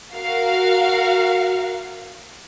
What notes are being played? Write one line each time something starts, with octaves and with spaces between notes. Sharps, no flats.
F#4 A#4 F5